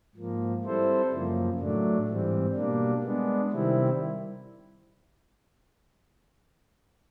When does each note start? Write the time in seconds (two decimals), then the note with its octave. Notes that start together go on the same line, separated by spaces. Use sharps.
0.15 G#2 F3 A#3
0.64 G3 C4 E4 A4 C5
1.11 F#2 C#3 F3 A#3
1.59 A2 F#3 A3 D4
2.07 G#2 E3 G3 C4
2.55 B2 G3 A#3 D4
3.03 G#3 B3 D4
3.51 C3 D#3 G3 C4 E4